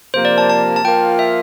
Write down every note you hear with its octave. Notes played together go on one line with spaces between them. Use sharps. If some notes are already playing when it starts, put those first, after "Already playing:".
C3 F3 A#3 C5
D5
A5
A5
A5
F3 A#3 F4 G5
E5